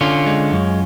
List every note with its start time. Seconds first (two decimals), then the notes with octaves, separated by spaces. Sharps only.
0.01 D3 C#4 F4
0.27 G#3
0.52 F#2